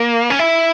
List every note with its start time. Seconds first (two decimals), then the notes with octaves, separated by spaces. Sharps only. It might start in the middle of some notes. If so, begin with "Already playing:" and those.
Already playing: A#3
0.30 C#4
0.39 E4